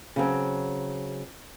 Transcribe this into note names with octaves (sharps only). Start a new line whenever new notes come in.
C#3 F#3 C4